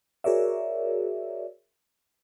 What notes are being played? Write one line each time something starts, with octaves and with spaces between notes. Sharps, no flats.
F#4 G#4 A#4 C#5 D5 E5